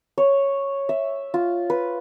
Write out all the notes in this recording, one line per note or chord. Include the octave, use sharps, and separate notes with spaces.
C#5
E5
F4
B4